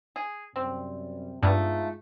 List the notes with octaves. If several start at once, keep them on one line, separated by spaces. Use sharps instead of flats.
G#4
F#2 C3 G3 C4
G2 G#3 A3 B3 D#4 F4